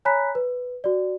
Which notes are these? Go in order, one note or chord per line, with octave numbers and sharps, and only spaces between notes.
C#5 G#5 A#5 B5 F#6 B6
B4
F#4 D5